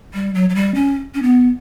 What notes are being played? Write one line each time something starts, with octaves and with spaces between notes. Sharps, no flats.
G3
F#3
F#3
G3
C#4
C#4
B3